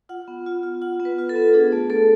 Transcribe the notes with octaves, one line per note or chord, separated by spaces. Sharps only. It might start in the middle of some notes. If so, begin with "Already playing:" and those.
F4 F#5
B3
F4
F4
F4 F#5
B3
B4
F4
A4
B3
D4 G#4
A3
A3 A4